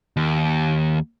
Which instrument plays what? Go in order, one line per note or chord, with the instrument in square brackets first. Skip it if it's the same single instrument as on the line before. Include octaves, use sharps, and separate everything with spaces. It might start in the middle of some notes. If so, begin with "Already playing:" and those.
[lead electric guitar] D#2